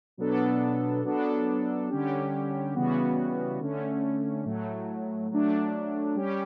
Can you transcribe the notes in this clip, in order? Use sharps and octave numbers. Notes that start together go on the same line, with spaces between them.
B2 F#3 B3 D4 A4
F#3 B3 D4 A4
D3 G3 C#4 G4
C#3 E3 G3 B3 F#4
D3 A3 C#4
A2 F#3 A3
F#3 A3 D4
G3 C#4 G4